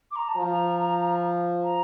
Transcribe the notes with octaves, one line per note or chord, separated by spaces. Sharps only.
D6
A#5
A5
F3 A#5
A#5